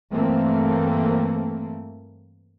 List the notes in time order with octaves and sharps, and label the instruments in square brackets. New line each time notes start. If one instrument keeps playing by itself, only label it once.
[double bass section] G2 E3 A3 A#3 C4